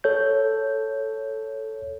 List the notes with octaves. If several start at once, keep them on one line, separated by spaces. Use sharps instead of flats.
A4 C#5 G6